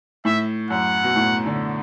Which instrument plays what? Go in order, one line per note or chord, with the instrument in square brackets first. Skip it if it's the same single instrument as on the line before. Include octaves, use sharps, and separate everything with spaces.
[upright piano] A2 [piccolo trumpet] E5
[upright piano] F#2 [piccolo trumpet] F#5
[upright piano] B2
A2
D3